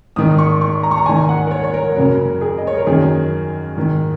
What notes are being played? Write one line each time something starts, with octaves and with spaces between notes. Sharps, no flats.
G#2 D#3 D#6
C#6
C#6
A#5
C#6
A#5
G#2 D#3 G#5
F#5
A#4
C#5
C#5
A#4
F#2 C#3 A#4
G#4
D#5
C#5
A#4
F#2 D#3 G#4
G#2 D#3